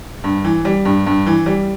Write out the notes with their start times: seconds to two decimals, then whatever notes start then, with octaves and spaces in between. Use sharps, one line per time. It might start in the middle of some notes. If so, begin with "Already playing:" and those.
0.24 G2
0.45 E3
0.65 G3
0.85 G2
1.06 G2
1.27 E3
1.46 G3